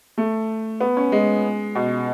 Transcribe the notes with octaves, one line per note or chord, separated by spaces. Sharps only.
A3
B3
C#4
G#3
B2